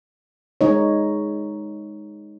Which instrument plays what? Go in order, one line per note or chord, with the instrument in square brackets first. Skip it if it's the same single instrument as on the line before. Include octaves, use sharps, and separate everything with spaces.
[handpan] G#3 D#4 C#5